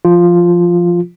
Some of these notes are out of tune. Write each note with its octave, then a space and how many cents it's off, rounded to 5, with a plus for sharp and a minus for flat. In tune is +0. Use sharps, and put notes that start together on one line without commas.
F3 -10 F4 +0